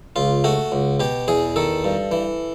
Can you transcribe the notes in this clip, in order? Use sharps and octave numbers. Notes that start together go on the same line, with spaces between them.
C#2 F4
A3 F#4
C#2
B2 G4
E2 G#4
D#3 A4
G2
E3